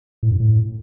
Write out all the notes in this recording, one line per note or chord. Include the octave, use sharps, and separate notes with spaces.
A2
F#2
A2